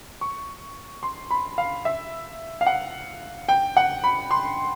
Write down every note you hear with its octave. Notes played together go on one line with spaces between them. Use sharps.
C#6
C6
B5
F5
E5
F5
F#5
G5
F#5
B5
C6